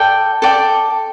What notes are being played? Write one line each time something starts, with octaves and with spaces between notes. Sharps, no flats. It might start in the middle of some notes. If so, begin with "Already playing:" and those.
Already playing: A4 D5 G5
A4 D5 G5